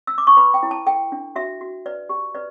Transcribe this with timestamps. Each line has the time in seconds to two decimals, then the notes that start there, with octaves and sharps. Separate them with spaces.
0.07 E6
0.18 D6
0.27 C#6
0.37 B4 B5
0.54 G5
0.63 E4
0.71 A5
0.86 A4 G5
1.12 D4
1.36 F#4 E5
1.61 F#4
1.86 B4 D5
2.09 G4
2.35 B4 D5